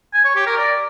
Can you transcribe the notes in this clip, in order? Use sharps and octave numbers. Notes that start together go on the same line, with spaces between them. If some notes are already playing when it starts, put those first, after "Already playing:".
G#5
C#5
G4
A#4
D5